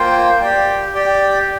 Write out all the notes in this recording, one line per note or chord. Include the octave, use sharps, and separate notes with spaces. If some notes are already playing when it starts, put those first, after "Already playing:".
Already playing: A#3 F4 C5 G5
G4 D5 G5
G4 D5 G5